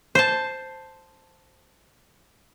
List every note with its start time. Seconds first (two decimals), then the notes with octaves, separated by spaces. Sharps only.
0.15 C5 A5